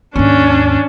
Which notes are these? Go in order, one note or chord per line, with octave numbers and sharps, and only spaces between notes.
D#2 G#2 C#4 D4